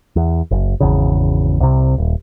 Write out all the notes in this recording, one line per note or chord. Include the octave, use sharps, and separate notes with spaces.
E2
F#1
G#1 E2 C#3
C2 C3
D#1